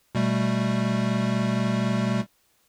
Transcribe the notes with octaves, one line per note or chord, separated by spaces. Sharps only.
B2 G3 A3